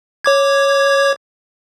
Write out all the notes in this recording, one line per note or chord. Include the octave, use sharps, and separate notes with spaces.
C#5 D6 G#6